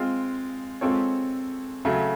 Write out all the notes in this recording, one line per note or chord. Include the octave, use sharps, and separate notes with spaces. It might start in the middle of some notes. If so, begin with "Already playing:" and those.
Already playing: G#3 C4 F4
G#3 C4 F4 A4 C#5
C#3 F#3 A3